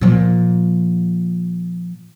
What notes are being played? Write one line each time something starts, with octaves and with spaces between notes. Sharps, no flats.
A#2 F3